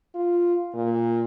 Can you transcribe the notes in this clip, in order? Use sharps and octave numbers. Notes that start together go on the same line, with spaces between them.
F4
A#2